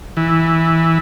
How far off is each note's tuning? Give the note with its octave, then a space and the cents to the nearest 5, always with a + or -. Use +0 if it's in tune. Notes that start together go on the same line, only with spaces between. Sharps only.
E3 -10